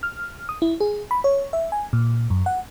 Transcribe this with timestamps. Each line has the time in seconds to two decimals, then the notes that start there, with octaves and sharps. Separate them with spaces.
0.03 F6
0.49 D#6
0.62 E4
0.80 G#4
1.11 B5
1.24 C#5
1.53 E5
1.72 G#5
1.93 A#2
2.30 F#2
2.46 F#5